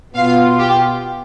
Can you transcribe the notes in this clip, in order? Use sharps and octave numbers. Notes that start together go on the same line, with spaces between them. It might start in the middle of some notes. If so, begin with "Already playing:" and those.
B2 B3 F4 F5
G4